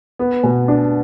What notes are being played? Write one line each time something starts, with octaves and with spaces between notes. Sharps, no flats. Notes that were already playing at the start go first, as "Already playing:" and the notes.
B3
B2
D4